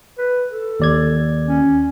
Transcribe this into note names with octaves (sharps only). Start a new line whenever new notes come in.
B4
A4
D#2 D5 G#6
C#4